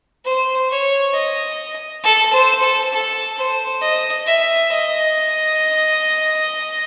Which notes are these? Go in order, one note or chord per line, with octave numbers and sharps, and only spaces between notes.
C5
C#5
D#5
A4
C5
A4
A4
C5
D#5
E5
D#5